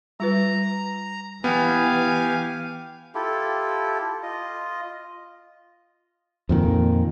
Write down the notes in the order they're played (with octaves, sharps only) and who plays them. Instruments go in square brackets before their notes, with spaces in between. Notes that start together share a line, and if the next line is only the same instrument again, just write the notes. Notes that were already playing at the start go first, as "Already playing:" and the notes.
[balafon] G3 F4 B4 [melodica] A#5
[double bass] E3 [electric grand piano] B3 [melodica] G4 F5 G#5
[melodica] E4 F4 G4 A4
F4 D#5
[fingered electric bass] F2 A#2 D#3